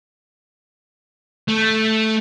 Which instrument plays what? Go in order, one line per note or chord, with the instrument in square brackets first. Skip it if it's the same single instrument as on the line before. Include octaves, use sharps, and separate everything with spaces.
[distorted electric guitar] A3